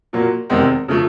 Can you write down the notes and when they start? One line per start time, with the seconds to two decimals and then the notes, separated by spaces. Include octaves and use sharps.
0.13 A#2 F#3 A#3
0.50 E2 C3 D#3 G#3 C4
0.88 C#3 F3 A3